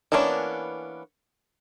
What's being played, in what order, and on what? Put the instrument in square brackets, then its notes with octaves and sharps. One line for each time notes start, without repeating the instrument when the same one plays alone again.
[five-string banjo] E3 A#3 B3 C#4 D4